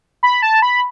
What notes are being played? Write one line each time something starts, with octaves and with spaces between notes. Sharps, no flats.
B5
A5
B5